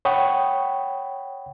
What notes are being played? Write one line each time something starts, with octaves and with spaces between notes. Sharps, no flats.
C#5 F#5 G5 B5 C#6 D#6